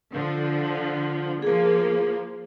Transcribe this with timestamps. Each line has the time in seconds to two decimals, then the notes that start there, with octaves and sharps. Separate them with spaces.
0.13 D3 F3
1.42 F3 A#3 G#4 A#4